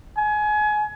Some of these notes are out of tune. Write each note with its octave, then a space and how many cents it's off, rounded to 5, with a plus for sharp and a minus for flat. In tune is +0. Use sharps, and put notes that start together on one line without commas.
G#5 +25